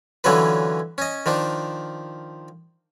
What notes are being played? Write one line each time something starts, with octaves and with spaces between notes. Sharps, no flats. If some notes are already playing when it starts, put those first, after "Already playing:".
D3 E3 F#3 C#4 F4 B4
C#4 D#5
D#3 F3 D4